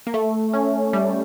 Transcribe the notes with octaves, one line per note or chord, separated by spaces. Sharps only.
A#3
A3
C#4
G3